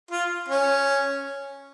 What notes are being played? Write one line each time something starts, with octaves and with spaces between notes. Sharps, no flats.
F4
C#4